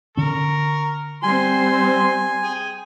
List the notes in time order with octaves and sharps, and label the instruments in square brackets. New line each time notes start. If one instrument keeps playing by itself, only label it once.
[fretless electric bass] D3 C#4 [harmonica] A#4 C#6
[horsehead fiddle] G3 C4 [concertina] G#5 [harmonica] C6
[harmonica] G#4 G5